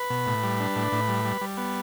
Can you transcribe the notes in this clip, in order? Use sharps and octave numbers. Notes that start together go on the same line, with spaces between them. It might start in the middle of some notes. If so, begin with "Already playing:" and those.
Already playing: B4
B2
A2
G3
D4
A2
A2
G3
G3
G3
B3